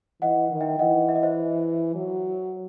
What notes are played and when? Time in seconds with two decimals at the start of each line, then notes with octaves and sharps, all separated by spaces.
0.22 E3 D#5 F#5
0.51 D#3
0.61 E5 G5
0.79 E3 D#5 F#5
1.09 E5
1.15 D#5
1.23 C5 E5
1.95 F#3